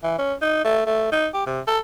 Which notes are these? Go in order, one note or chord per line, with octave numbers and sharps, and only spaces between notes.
E3
C#4
D#4
A3
A3
D#4
G4
C3
A4